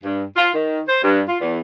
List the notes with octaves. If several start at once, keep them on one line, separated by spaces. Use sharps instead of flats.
G2
F4
D#3
C5
G2
F4
E2